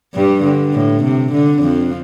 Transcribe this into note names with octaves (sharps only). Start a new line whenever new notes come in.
G2 G3
D3
A2
C3
D3
F2 F3